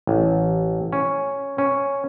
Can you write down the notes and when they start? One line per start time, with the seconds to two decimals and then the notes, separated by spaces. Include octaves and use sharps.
0.07 A1
0.93 C#4
1.58 C#4